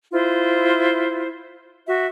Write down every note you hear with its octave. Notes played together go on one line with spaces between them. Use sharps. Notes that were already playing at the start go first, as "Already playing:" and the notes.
E4 F4 C5
F#4 E5